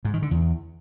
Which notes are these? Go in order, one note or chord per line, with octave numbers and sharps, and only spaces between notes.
G#2
D#3
D3
E2